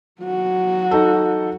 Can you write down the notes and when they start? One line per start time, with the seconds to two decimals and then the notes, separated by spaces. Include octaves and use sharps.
0.22 F#3 F#4
0.91 D#4 A4